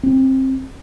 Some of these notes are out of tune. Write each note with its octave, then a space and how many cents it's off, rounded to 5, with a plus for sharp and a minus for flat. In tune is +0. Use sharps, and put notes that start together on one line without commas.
C4 +20